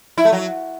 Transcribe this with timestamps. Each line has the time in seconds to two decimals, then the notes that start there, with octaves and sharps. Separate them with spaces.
0.18 E4
0.25 A3
0.32 F#3